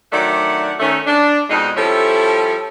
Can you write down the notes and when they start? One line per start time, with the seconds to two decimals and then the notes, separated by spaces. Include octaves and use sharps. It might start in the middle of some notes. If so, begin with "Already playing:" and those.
0.12 D#3 F#3 A3 D4 D5 F#5
0.80 D#3 A3 C#4
1.06 D4
1.50 F2 B2 G#3 D#4
1.77 F3 G3 C#4 E4 A4